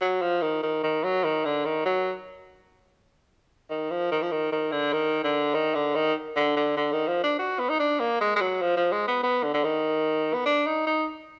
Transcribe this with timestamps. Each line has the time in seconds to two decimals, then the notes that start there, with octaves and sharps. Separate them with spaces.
0.01 F#3
0.22 F3
0.42 D#3
0.63 D#3
0.83 D#3
1.04 F#3
1.24 D#3
1.45 D3
1.65 D#3
1.86 F#3
3.70 D#3
3.91 F3
4.11 D#3
4.22 F3
4.32 D#3
4.52 D#3
4.72 D3
4.93 D#3
5.24 D3
5.54 D#3
5.75 D3
5.95 D#3
6.36 D3
6.57 D3
6.77 D3
6.93 D#3
7.08 F3
7.24 D4
7.39 F#4
7.59 B3
7.69 D#4
7.80 D4
8.00 A#3
8.21 G#3
8.36 G#3
8.41 F#3
8.62 F3
8.77 F3
8.92 G#3
9.08 B3
9.23 B3
9.43 D3
9.54 D3
9.64 D#3
10.34 B3
10.46 D4
10.66 D#4
10.87 D#4